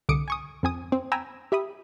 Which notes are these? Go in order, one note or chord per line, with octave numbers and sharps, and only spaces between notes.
C2 D3 D6 D#6 C#7 D7
G#5 C#6 D#6
F2 C4 G#5 D#6
C4
G5 G#5 A#5 B5 E6
G4 E5 B5 D#6